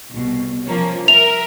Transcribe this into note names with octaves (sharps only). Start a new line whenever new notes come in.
C2 B2
F3 A#3 C#4
A#4 E5 F7